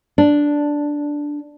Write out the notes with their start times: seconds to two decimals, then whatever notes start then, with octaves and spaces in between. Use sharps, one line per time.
0.18 D4